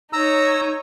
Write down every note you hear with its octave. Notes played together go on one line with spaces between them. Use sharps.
D#4 C#5 A#5 E6